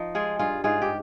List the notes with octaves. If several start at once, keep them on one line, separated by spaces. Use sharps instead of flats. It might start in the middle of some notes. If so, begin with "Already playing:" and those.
Already playing: F3 D#4
G#3 F4 G#4
G2 F4 G#4
G#2 F4 G#4
G4